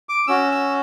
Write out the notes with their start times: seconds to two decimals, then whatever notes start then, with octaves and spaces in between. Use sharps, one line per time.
0.09 D6
0.27 C#4 F#4 E6
0.51 E6